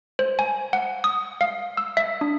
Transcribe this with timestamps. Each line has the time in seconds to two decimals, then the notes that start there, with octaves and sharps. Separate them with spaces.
0.19 C5
0.39 G#5
0.73 F#5
1.04 D#6
1.41 F5
1.77 E6
1.97 E5
2.21 D4